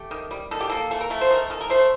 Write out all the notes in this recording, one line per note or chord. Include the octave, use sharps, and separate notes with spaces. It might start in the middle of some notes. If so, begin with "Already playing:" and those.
Already playing: A3 G4
D#3
G3
D#3 A4
G4
A#3 A4
A3 A4
A#4
A3 A4
C5
D#3 A#4
D#3 A4
A#4
A3 C5